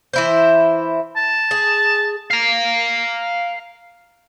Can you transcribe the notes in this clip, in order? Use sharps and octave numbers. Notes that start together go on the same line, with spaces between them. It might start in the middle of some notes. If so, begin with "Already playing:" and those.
E3 E4 C5
A5
G#4
F5 A#5